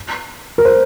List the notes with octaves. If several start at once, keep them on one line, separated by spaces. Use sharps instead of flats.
A#4
C5